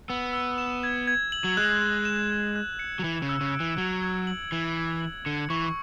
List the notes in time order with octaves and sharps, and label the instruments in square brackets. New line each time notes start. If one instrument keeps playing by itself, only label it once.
[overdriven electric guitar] B3 [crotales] E6
[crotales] E6
E7
G#6
G#6
F#7
[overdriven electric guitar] F#3
[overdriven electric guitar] G#3 [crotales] F#6
[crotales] F#6
E7
F#6
F#6
C#7
[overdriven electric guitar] F#3
[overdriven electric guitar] E3 [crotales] F#7
[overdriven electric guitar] C#3
[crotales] E6
[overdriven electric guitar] C#3
[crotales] D7
[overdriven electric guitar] E3
[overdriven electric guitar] F#3 [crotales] G#6
[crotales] G#6
F#7
[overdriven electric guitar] E3 [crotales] G#6
[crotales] G#6
F#7
[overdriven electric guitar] D3 [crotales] C#7
[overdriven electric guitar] E3 [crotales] C#6